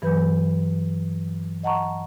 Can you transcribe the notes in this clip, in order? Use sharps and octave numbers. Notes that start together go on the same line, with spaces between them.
G2 E3 F#3 B4 B5 G6
D#5 F#5 A5 A#5 C#6